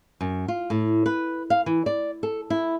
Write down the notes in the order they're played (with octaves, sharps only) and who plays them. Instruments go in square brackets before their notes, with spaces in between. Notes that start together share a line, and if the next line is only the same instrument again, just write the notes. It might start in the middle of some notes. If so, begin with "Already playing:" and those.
[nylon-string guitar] F#2
F4
A2
B4
F5
E3
D5
A4
E4